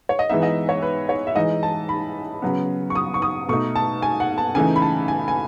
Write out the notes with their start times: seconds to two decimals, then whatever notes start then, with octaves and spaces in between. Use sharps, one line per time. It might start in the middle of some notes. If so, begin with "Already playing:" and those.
0.09 C#5
0.19 D#5
0.29 E3 G#3 B3 D#4 E5
0.43 D#5
0.69 C#5
0.82 B4
1.09 C#5
1.27 E5
1.36 E3 G#3 D#4 D#5
1.63 A5
1.89 B5
2.42 C#3 F#3 B3
2.90 C#6
2.95 D#6
3.14 C#6
3.22 D#6
3.49 B2 A3 D#4 C#6
3.76 A5
4.02 G#5
4.20 F#5
4.38 A5
4.55 C#3 E3 A3 D#4 G#5
4.76 B5
4.82 A5
5.08 G#5
5.28 G#5